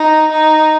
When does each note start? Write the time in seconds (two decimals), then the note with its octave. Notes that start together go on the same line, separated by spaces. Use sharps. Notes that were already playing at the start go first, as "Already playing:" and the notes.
Already playing: D#4
0.31 D#4